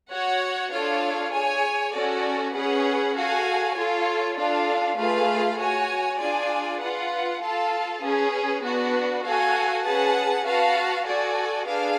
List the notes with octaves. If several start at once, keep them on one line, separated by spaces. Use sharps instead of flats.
F#4 C#5 F#5
D4 F4 A4 C#5 F5
G#4 C#5 G#5
C#4 F#4 A4 D5
C#4 G#4 B4 F#5
F#4 A4 F5 G#5
F4 A4 C#5
D4 F4 A4 F5
A3 F4 G#4 B4 F5
F#4 C#5 G#5
D4 F4 G#4 D5 G#5
F4 B4 F#5
F4 A4 F5 A5
C#4 G#4 B4
B3 D4 F#4 B4
F#4 A4 F5 G#5
C#4 G#4 B4 F#5 A5
F#4 B4 F5 A5
F#4 A4 D5 G#5
D4 G#4 B4 F5